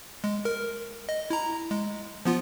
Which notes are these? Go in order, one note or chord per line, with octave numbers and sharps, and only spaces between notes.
G#3
A#4
D#5
E4 A#5
G#3
F3 B3 F4